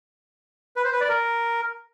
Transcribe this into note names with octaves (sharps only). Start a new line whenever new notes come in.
B4
C5
B4
D5
A#4